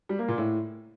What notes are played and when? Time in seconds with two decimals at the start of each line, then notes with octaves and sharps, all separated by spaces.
0.09 G3
0.19 A#3
0.28 A#2
0.38 A2